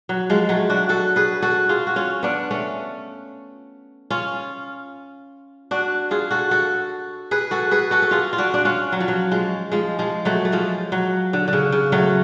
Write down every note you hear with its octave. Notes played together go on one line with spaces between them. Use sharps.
F#3
F3 G#3
F#3 A3
D4 F#4
F#4 A4
G#4 B4
F#4 A4
F4 G#4
F#4
C#4 F4
B3 D4
A3 C#4
C#4 F4
D4 F#4
F4 G#4
F#4 A4
F#4 A4
G#4 B4
F#4 A4
G#4 B4
F#4 A4
A4
F4 G#4
F4
D4 F#4
D4
C#4 F4
F#3
F3
F#3
F3 G#3
F3 G#3
F3 G#3
F#3 A3
A3
F3 G#3
F#3
D3
D3
C#3
C#3
F#3 A3